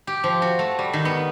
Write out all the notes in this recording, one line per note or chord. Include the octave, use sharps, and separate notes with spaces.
G4
F3
F#4
A3
G3
D#3
B3